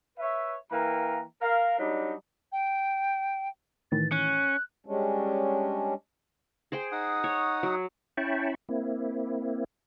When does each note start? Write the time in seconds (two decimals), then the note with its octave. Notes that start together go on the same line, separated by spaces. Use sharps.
0.18 B4 C#5 E5
0.71 E3 A#3 F5 G5 A#5
1.42 A#4 F5
1.79 F#3 G3 D4 D#4
2.52 G5
3.92 A2 D#3 E3 A6
4.12 C#4 F#6
4.86 G3 G#3 C#4 D4
6.72 G#4 C5 G5
6.92 D#4 F#5 D#6
7.24 C#5
7.63 F#3
8.17 C#4 E4 G5 A5 B5 C#6
8.69 A#3 C4 E4